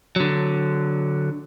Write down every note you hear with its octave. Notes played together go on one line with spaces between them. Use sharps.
D3 F#3